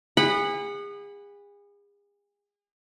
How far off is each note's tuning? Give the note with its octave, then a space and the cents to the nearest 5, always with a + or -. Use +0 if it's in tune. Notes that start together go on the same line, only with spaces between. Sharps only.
G#4 -35 F#5 +0 B5 +0